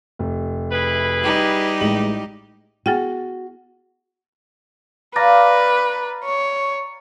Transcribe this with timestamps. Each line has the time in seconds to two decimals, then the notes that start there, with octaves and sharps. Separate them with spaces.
0.19 F1
0.71 E4 G#4 B4
1.23 G3 D#4 G4
1.81 A1 G#3 F#7
2.86 B3 F#4 G#4 G5
5.16 B4 D5 F5 A#5
6.25 C#5